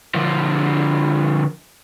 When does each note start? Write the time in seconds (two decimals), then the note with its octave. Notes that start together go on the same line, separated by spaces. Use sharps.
0.15 D3 F3